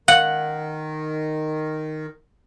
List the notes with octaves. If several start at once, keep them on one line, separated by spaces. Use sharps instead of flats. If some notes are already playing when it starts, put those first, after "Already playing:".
D#3 F5 F#5